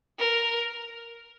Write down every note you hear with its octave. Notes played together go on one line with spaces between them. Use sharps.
A#4